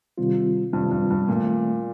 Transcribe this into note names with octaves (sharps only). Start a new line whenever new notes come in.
C3 D#3 G3 C4 F4
G2 C3 D#3 G3 C4 F4
G2
G2
A#2 D#3 A3 C4